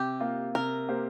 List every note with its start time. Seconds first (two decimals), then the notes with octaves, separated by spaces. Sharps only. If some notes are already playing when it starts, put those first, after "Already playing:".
Already playing: C3 G4
0.20 A#3 F4
0.55 C3 A#4
0.88 A#3 G4 C5